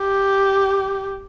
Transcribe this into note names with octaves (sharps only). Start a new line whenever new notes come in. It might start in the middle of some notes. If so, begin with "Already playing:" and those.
Already playing: G4